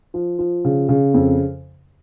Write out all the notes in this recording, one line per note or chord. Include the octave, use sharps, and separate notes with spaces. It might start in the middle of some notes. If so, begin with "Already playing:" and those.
F3
F3
C#3
C#3
F2